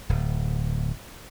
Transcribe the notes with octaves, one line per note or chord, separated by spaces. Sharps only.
D1